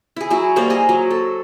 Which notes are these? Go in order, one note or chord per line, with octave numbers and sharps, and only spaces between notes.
E4 G#4
F#3 E4 G#4
G3 A#3 C5 C#5
G#4 D#5
F#3
A4